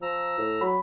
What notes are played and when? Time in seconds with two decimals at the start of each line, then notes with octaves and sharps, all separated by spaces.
0.02 F3 A#5 E6
0.38 A2
0.61 F#3 B5